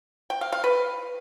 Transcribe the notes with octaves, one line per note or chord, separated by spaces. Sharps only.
G5
F5
F5
B4